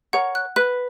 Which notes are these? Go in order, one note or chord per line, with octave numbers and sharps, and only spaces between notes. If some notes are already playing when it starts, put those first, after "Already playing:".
A#4 C#5 F#5
F#6
B4 F#6